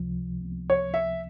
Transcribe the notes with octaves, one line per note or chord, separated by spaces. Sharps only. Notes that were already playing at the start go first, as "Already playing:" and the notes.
Already playing: C#2 C3 F3
C#5
E5